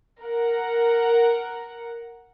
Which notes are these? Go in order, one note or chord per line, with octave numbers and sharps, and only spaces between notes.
A#4 F#5